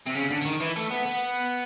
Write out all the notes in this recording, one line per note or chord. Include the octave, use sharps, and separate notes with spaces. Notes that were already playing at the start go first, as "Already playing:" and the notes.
C3
C#3
D3
D3
D#3
E3
A3
B3
B3